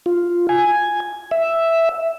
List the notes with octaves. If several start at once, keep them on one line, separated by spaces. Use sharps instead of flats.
F4
G#5
E5